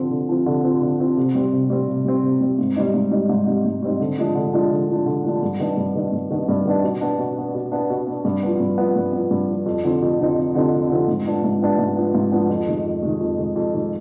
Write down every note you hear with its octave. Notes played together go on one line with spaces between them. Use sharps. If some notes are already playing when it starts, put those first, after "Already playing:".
Already playing: D3 F3 C4
D3
F3 C4
D3
F3 C4
D3
F3 C4
C3
G3 C4
C3
G3 C4
C3
G3 C4
C3
G3 C4
G#2
G3 C4 D#4
G#2
G3 C4 D#4
G#2
G3 C4 D#4
G#2
G3 C4 D#4
D3
F3 G#3 D4
D3
F3 G#3 D4
D3
F3 G#3 D4
D3
F3 G#3 D4
G2
D#3 B3 D4
G2
D#3 B3 D4
G2
D#3 B3 D4
G2
D#3 B3 D4
B2
B3 D4
B2
B3 D4
B2
B3 D4
B2
B3 D4
G2
F3 B3
G2
F3 B3
G2
F3 B3
G2
F3 B3
F2
D3 F3 C4 D#4
F2
D3 F3 C4 D#4
F2
D3 F3 C4 D#4
F2
D3 F3 C4 D#4
G#2
F3 B3 D4
G#2
F3 B3 D4
G#2
F3 B3 D4
G#2
F3 B3 D4
F2
D#3 G#3
F2
D#3 G#3
F2
D#3 G#3
F2
D#3 G#3